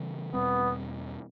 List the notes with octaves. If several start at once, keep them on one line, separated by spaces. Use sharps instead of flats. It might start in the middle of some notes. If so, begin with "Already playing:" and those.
Already playing: C#3 E3 G3 C4
E2 B2 G3 B3 C4